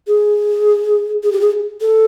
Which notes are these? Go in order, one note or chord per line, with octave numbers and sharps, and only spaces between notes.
G#4
G#4
G4
G#4
A4